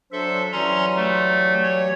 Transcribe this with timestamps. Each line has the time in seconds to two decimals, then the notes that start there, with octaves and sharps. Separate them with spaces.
0.12 F#3 D4 A4 C5 E5
0.52 E3 F#3 G3 C#4 A#5 C6
0.96 A3
1.63 C#5